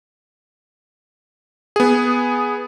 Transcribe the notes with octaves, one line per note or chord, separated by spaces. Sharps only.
B3 G#4